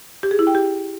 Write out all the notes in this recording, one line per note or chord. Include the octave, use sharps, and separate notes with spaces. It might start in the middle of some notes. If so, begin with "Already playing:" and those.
G4
G#4
E4
G5
G4